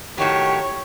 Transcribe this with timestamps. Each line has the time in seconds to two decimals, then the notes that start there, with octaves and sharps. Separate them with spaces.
0.18 A2 D#3 F#3 G4 C#5